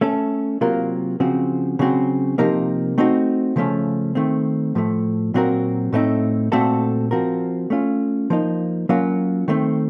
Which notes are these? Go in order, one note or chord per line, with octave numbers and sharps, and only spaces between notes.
A3 C#4 A4
C3 F#3 A#3 F4 A#4
C#3 F3 C4 F#4
C#3 F#3 C4 F#4
C3 F3 A#3 D#4 A#4
A3 C4 D#4 F#4
C#3 F3 A3 C#4
D#3 A3 C4
A2 F3 A3
A#2 F#3 C4 F#4 A#4
A2 A3 C4 D#4
A#2 A3 C4 F#4 A4
F3 C4 F#4 A#4
A3 C#4 F4
F3 A#3 D#4
F#3 A#3 C#4 F4
D#3 A3 C4